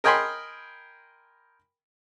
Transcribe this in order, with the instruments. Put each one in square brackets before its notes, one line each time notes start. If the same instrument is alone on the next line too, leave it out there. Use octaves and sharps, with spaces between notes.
[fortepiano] A#4 D#5 G5 G#5 B5 C6